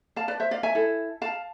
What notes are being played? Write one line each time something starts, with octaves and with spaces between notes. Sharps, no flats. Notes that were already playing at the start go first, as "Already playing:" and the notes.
F5 A5
B4 D5
C5 E5
D5 F5
E5 G#5
E4 A4
F5 A5